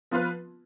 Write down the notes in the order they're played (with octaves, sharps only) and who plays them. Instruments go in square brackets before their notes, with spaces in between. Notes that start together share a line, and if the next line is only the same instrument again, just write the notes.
[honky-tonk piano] F3 B3 F4 B4